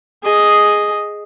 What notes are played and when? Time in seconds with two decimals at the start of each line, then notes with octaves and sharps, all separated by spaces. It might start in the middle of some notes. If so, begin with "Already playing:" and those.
0.24 G#4 D#5